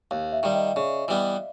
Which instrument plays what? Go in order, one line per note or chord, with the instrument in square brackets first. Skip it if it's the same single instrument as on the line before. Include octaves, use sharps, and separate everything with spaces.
[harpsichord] D#2 [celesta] F5
[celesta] E5
[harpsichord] D#3 G3
[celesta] D#5
[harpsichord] C#3 [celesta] D5
[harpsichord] E3 G3 B3